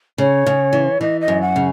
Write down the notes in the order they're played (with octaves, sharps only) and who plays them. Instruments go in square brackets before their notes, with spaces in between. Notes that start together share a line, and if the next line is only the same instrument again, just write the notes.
[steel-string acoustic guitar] C#3 [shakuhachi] C#5
[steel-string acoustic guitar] C#3
E3
[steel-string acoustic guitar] E3 [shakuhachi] D#5
[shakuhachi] D#5
[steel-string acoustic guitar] F#2
[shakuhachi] F#5
[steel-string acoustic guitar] C#3